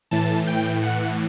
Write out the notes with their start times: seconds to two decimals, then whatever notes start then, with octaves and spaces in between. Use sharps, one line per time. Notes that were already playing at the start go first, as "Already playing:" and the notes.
0.11 A2 E3 A5
0.47 G5
0.83 F#5